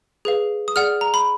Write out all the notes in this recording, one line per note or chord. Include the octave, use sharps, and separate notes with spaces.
G#4 B4 F5
D#6
G#4 D5 F#5 F6
A#5
B5